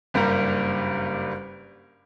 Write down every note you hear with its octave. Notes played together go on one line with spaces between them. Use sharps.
F#1 G2 G3 A#3 A#5